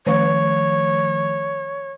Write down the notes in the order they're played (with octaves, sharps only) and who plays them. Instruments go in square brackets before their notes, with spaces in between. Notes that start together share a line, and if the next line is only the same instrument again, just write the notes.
[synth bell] D#3 F3 A3 [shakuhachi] C#5